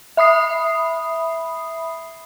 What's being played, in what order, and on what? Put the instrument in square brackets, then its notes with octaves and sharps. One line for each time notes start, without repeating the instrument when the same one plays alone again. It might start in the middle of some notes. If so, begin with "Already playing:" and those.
[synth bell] E5 B5 D#6 C7